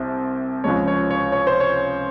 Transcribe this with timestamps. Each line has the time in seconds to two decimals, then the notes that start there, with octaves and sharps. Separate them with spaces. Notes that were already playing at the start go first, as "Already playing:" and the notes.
Already playing: C2 C3 C5
0.64 C#2 C#3 F3 G#3 C#5
0.88 C#5
1.11 C#5
1.32 C#5
1.47 C5
1.60 C#5